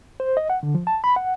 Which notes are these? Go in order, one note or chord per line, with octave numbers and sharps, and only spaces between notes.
C5
D#5
F#5
D3
F3
A5
B5
F#5